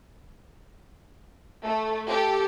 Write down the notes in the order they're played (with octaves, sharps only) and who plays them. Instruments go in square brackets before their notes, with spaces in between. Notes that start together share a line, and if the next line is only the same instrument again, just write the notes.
[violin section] A3
G4 A4